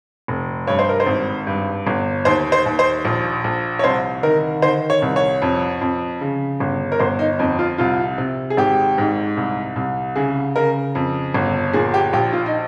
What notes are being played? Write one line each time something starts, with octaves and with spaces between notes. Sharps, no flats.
F1
G2 C#5
C5
A#4
C5
G#1
G2
G1
D#2 C5
C5
D#2
C5
A#1
A#1
C#5
C2 C5
D#3 A#4
D#3 C5
C#5
C2
C#5
F2
F2
C#3
G1
A#4
G1 C5
D#4
F2 D#4
F4
C2 F4
C3
G#4
G#1 G4
G#2
C2
C2
C#3 G#4
C#3 A#4
F2
G1
A#2 G#4
G4
A#1 G4
F4
D#4